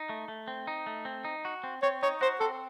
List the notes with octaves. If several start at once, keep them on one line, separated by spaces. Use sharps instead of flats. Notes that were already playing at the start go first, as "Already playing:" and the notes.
Already playing: D#4
A3
A3
C4
D#4
A3
C4
D#4
F#4
C4
C4 C#5
D#4 C#5
F#4 C5
C4 A4